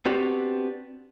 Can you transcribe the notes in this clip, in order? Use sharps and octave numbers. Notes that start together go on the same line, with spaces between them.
B3 C4 D4 F#4 G4